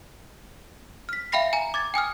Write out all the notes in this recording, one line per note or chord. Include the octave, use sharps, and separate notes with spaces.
F6 B6
E5 F5 G5 B5 A#6 C7
G#5 A#5
D6 G#6 A6
G5 G#5 D#6 F6